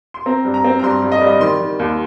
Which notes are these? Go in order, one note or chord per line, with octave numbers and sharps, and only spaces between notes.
C6
C4 A#5
G2
A#5
C4
A#5
G2 C6
G2
D#5
G3
D#5
D#3 C6
D#3
D#2